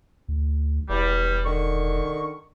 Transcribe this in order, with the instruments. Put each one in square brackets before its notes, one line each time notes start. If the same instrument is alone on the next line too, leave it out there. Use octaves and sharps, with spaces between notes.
[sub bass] D2
[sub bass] E1 [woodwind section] E2 G3
[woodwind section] D3 D#3 C#6